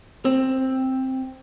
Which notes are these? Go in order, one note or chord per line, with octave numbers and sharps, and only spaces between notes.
C4